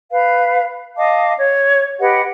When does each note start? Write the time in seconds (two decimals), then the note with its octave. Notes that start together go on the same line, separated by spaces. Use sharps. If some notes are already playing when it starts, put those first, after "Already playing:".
0.12 B4 F5
0.96 D#5 F5 A5 D6
1.38 C#5
2.00 G4 B4 D#5 F#5